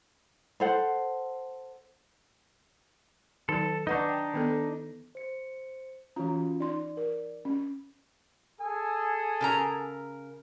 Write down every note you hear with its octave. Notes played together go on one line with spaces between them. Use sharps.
A4 C5 F#5
D#3 F#3 D#4 A4
D4 D#4 B4 F#5 C#6
G5
D#3 B3 A4
C5 C#7
E3 C#4 F4 F#4 A#5
D#4 D5 C6
A#4
C#4
G#4 A4 G#5
C#3 A#4 A#5